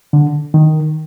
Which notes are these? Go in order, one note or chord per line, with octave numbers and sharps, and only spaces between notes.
D3
D#3